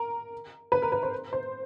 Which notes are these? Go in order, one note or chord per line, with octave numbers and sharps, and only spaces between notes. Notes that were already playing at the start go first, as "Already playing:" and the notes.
Already playing: A#4
B4
A#4
B4
C5
C5